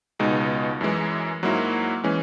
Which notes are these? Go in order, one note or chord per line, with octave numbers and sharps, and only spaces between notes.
C#2 B2 G#3 D#4
F#2 E3 G#3
G#2 F#3 A#3 E4
E3 G#3 C#4